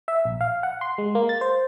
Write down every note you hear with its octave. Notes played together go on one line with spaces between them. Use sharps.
E5
A#1
F5
F#5
C6
G#3
A#3
A6
C5